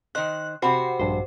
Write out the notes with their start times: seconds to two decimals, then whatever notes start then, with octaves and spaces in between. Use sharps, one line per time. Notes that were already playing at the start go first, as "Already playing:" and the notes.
0.15 D#3 C5 D#5 F#6
0.62 C3 F#4 G4 C5 B5
1.00 A#1 G2 C5